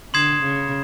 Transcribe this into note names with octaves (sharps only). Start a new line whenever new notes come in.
D3 C6 D#6 G#6 C7 E7
C#3